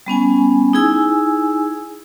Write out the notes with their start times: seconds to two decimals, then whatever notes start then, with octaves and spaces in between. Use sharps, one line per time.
0.06 G3 B3 C#4 G#5
0.73 D#4 E4 G#4 G#5 E6